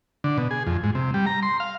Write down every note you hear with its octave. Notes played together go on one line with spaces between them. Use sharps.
D3
B2
G#4
F2
G#2
C3
G3
A#5
C6
F5